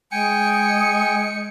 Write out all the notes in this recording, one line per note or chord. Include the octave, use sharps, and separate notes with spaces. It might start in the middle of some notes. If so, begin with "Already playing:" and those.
G#3 G5 G#5 C#7